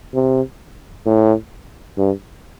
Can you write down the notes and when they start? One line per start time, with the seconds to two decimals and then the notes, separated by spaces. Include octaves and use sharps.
0.14 C3
1.06 A2
1.98 G2